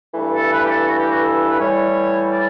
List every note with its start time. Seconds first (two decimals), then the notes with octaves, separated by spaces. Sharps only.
0.14 G2 E3 A3
0.32 A4
0.50 B4
0.62 G4
0.68 A4
0.86 F#4
0.97 G4
1.09 F#4
1.22 A4
1.47 B4
1.57 A2 E3 G3 C#5
2.30 D5